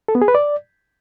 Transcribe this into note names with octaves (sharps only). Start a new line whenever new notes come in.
A4
B3
G#4
B4
D5